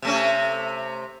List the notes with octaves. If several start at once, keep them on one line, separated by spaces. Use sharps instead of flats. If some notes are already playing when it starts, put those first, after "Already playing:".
C3 A3 C#4